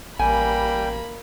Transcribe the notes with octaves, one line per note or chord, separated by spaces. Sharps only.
A1 G3 A#3 G5 G#5 B5